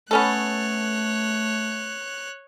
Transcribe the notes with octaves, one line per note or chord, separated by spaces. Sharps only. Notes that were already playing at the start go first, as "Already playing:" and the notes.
A3 B3 C#4 A4 C#5 F#6